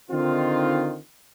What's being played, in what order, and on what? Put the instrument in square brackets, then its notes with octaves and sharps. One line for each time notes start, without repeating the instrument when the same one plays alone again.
[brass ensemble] D3 D#3 C4 D#4 F4